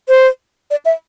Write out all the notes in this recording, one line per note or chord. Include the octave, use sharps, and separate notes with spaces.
C5
D5
E5